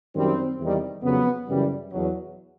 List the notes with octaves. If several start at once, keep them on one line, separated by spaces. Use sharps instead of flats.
F#2 D#3 G3 C4
E2 C3 D#3 G3
F2 C#3 F#3 B3
F#2 C#3 E3 G3
E2 B2 F#3